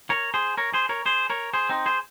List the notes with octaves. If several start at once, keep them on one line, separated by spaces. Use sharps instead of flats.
A#4 C#5
G#4 C5
A#4 C#5
G#4 C5
A#4 C#5
G#4 C5
A#4 C#5
G#4 C5
C4 D#4
G#4 C5